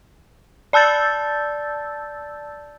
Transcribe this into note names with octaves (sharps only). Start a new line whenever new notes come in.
D5 A5 E6 G6 A6